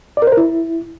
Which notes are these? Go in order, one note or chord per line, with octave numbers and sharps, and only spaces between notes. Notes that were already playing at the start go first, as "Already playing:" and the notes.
D5
A#4
C5
A#4
E4